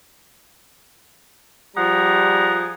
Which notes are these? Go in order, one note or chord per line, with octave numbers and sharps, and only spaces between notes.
F3 G3 G#4 F#5 A#5